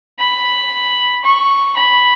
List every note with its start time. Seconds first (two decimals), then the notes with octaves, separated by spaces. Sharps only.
0.19 B5
1.24 C#6
1.78 B5